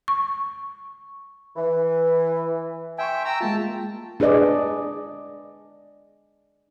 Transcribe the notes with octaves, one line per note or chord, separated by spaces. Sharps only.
C#6
E3
E5 G5 G#5 C6 C#6
G5 A#5 E6
G#3 A#3 F4 A5
D4 G#4 B4 D5 D#5